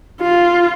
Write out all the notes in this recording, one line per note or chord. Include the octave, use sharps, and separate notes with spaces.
F4